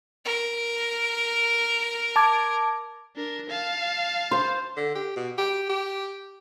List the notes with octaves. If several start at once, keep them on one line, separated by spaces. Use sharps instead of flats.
A#4
A5 D6 G#6
D4 A#4
F5 A5
C5
D3
G4
B2
G4
G4